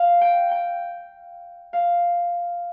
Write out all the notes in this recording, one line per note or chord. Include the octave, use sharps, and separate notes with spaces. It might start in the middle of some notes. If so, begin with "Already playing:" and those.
Already playing: F5
G5
G5
F5